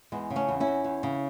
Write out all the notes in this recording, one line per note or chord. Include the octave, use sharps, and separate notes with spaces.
E2 G#3 B3
C#3
A3 C#4
E2
C#4 E4
E2
E2
C#3